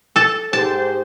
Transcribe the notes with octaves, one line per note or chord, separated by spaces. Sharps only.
A4 A5
G#2 G4 C5 A5